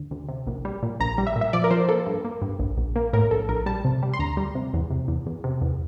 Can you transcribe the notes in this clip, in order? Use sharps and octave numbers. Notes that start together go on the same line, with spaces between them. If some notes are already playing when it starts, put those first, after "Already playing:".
Already playing: D2
D2
C3
A#1
G3
A#2
A#1 A#5
G3
E5
A#2
E5
F3 D5
A#4
F3 C5
A#3 A4
G2
A#3
G2
A#1
A#1
A#3
A2 A#4
A#1 A4
A#1 A#4
G3 A5
C3
G3
C6
D2 A#5
G3
C3
E2
C3
E2
E2
C3
E2